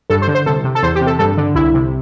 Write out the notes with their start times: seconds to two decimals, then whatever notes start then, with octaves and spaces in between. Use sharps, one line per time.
0.10 G2 A4
0.22 C5
0.28 D3
0.35 C5
0.46 C2 A4
0.64 C3
0.75 A4
0.82 E2 C5
0.95 G4
1.01 C3
1.07 A4
1.19 G2 A4
1.37 D3
1.55 C2 E4
1.74 C3